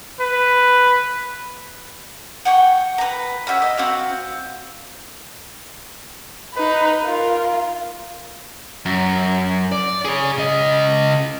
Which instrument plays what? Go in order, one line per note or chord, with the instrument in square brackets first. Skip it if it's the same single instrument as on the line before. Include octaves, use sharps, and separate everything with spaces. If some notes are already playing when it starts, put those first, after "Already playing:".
[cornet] B4
[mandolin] F#5 G5 C#6
B4 A#5
C#4 F#4 E5
D#5 E6
C4 F#4 F5
[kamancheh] D#4 B4
F4 A#4
[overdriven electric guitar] F#2
D5
G#4 C#5
C#3 D#5